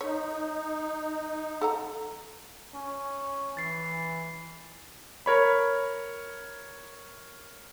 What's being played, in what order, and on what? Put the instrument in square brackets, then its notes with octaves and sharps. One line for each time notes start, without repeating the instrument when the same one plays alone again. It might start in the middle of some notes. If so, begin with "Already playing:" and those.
[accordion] D#4 [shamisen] C#5
[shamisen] A4 F#5 A#5
[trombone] C#4
[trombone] E3 [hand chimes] A6 C7
[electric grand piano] A#4 C#5 B5